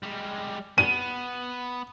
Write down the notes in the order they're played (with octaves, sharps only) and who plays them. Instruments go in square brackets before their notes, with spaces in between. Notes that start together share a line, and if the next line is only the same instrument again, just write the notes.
[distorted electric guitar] G3 G#3
[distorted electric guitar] B3 [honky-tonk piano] D#7